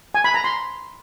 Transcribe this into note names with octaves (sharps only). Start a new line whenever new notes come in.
G#5
B5
A#5
C6